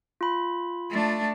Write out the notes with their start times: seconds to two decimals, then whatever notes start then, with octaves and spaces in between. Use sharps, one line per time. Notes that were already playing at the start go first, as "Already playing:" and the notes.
0.21 F4 B5
0.90 A3 D4